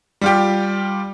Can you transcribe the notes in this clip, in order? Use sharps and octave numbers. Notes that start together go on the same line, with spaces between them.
G3 F4 G4